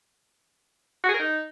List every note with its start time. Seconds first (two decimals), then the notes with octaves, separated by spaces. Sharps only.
1.04 F#4
1.09 G#4
1.14 A#4
1.19 D#4